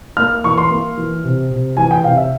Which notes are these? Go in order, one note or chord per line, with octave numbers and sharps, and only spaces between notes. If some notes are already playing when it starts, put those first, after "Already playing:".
A#3 F6
E3 C#6
C6
A#3
E3
C3
C3
E3 G#5
G5
C3 F5
E5